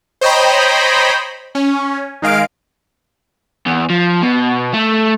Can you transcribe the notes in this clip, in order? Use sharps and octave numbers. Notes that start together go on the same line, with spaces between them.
C5 C#5 D#5 G5 A#5 B5
C#4
D#3 G#3 F5 D7
E2
F3
B2
A3